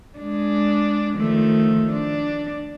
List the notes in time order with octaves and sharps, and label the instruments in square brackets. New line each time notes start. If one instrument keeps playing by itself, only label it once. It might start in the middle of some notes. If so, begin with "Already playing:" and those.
[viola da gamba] G#3 D4
D#3 F3 A3
D4